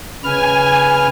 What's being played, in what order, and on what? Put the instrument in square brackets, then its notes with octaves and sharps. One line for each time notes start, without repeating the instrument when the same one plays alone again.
[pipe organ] C#3 B4 F6 [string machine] G#5